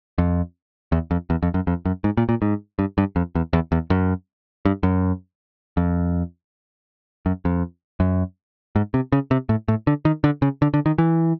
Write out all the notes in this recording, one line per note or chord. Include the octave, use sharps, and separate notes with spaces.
F2
E2
F2
E2
F2
F#2
F2
F#2
G#2
A#2
A#2
G#2
G2
G2
F2
E2
E2
E2
F#2
G2
F#2
F2
F#2
F2
F#2
G#2
C3
C#3
C3
A2
A2
D3
D#3
D3
C#3
D3
D3
D#3
E3